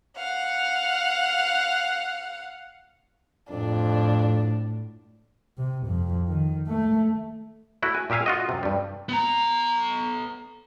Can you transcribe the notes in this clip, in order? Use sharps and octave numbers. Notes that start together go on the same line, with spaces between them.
F5 F#5
F2 A2 D4
C3
F2
D#3
A3
A3 E4 F#4 F#5
G#5
A#2 G4 E5 F5 G#5
F4 F#4 D#5
F#2 C3
G2 G3
B3 A#5